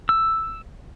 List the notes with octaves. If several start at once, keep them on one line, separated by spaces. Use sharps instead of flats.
E6